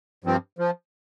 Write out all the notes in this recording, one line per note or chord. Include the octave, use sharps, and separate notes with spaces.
G2 F3 C4
F3